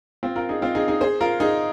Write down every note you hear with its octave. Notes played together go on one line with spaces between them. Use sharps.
C4 F4
F4 A#4
D#4 G#4
C4 F4
D#4 G#4
D#4 G#4
G#4 C5
F4 A#4
D#4 G#4